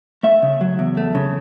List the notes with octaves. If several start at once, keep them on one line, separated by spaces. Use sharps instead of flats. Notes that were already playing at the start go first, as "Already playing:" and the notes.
A3 E5
C#3
F#3
E2
A3
C#3